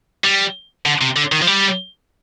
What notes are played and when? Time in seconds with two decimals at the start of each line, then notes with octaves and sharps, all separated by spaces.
0.24 G3
0.86 D3
1.01 C3
1.16 D3
1.32 D#3
1.42 F3
1.47 G3